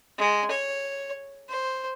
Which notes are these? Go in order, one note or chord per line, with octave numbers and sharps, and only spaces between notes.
G#3
C#5
C5